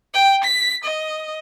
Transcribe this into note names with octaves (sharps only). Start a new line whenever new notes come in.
G5
B6
D#5